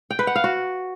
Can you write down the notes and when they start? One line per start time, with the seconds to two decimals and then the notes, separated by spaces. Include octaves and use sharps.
0.11 G5
0.19 B4
0.27 F#5
0.36 F5
0.44 F#4